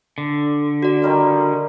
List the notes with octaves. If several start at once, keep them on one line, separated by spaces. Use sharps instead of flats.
D3
F#4 D5
D#3 G3 F5